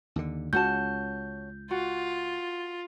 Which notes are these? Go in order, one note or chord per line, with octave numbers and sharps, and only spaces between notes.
D#2 D3
C#2 C#4 F#4 A5 G6
F4 F#4